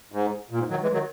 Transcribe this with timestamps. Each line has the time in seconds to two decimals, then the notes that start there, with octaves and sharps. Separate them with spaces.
0.12 G#2
0.51 A#2
0.59 G#2
0.70 D#3 F#3
0.82 E3 G#3
0.93 D#3 F#3